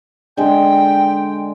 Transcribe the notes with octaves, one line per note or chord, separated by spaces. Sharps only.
D3 G#3 G5